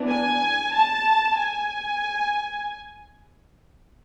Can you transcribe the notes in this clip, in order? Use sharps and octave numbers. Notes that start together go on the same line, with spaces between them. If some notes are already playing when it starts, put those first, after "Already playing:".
Already playing: E3 B3 D4
G#5
A5
G#5